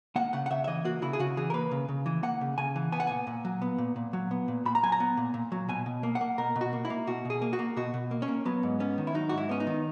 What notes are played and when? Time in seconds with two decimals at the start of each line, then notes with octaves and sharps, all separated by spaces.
0.16 A#3 F#5
0.33 C#3 F#5
0.46 F#5
0.50 C#3 E5
0.64 E5
0.68 E3 D#5
0.85 A#3 F#4
1.02 C#3 E4
1.13 G#4
1.19 C#3 F#4
1.37 E3 G#4
1.50 A#4
1.54 A#3 B4
1.71 C#3
1.89 C#3
2.06 E3
2.23 A#3 F#5
2.41 C#3
2.58 C#3 G#5
2.76 E3
2.92 B3 G#5
3.00 F#5
3.07 A#2 G#5
3.27 A#2
3.45 F#3
3.62 B3
3.78 A#2
3.96 A#2
4.13 F#3
4.31 B3
4.48 A#2
4.65 A#2 B5
4.75 A#5
4.83 F#3 G#5
4.92 A#5
5.00 B3
5.17 A#2
5.34 A#2
5.52 F#3
5.69 B2 G#5
5.86 B2
6.03 A#3
6.15 F#5
6.21 A#3
6.38 B2 A#4
6.56 B2
6.61 F#4
6.73 A#3
6.85 E4
6.90 A#3
7.07 B2 F#4
7.25 B2 G#4
7.42 A#3
7.53 F#4
7.59 A#3
7.77 B2 F#4
7.94 B2
8.11 A#3
8.22 C#4
8.28 A#3
8.45 F#3 B3
8.63 G#2
8.80 B3 C#4
8.98 D#3
9.07 E4
9.14 F#3 D#4
9.29 G#2 F#4
9.38 E4
9.49 B3 C#4
9.60 D#4
9.67 D#3